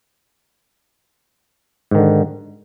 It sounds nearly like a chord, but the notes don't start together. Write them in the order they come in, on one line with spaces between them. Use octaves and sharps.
G#2 D#3 D3